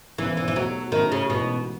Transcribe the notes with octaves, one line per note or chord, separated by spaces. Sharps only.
E1 E2 C#3 E3
E3
E3
B2 F#3 A3 D#4 F#4
A2 D#3 F#3 A3 C#4 E4
C#3
A1 G#2 B2 E3 B3 F#4